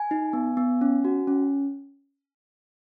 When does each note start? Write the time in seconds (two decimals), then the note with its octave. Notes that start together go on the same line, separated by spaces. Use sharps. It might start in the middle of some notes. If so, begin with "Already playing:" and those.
Already playing: G#5
0.11 D#4
0.33 B3
0.57 B3
0.81 C#4
1.04 F#4
1.27 C#4